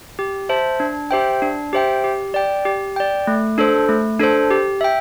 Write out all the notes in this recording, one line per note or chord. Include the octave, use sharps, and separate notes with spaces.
G4
C5 E5 A5
D4
G4 C5 E5 G5
D4
G4 C5 E5 G5
G4
D5 G5
G4
D5 G5
A3
D4 A4 C5
A3
D4 A4 C5
G4
E5 G5